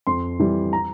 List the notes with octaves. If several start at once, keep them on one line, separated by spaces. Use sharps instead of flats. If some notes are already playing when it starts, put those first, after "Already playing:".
F2 C6
E3 G3
A#5